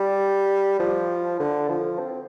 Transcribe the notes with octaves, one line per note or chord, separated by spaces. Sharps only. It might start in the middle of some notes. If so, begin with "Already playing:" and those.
Already playing: G3
F3
D3
F3
C4